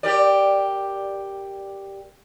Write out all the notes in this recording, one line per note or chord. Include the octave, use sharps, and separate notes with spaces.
G4 A#4 D5